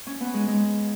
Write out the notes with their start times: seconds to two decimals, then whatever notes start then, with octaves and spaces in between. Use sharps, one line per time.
0.07 C#4
0.21 B3
0.34 G#3
0.48 G#3